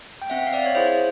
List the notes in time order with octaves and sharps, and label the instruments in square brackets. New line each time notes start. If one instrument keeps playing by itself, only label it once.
[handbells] G5
C4 E5 F#5
F5
D5 E5
C#5
E4 G#4 C5